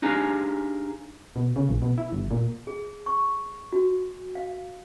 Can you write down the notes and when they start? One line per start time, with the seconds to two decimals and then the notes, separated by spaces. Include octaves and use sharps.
0.02 D4 D#4 G4 G#4 F5 A#5
1.36 B2
1.56 C#3
1.69 A#1
1.82 B2
1.98 E4
2.12 G1
2.31 A#2
2.67 G#4
3.06 C#6
3.72 F#4
4.35 F5